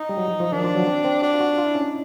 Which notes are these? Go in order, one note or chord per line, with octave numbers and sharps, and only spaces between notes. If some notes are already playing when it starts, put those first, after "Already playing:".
Already playing: D#4
G3
F#3
F3
F3
D#3 D4
F3
F#3
C4
C4
D4 F#4
F4
F#4
F4
E4
C#4
D#4